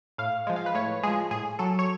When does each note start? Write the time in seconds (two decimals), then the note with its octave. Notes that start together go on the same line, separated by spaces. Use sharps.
0.18 A2 F5
0.47 F3 G#3
0.56 F5
0.66 B4
0.74 A2 C#5
1.03 F3 G#3 G#4
1.31 A2 G#4
1.59 F#3 A4
1.79 C#5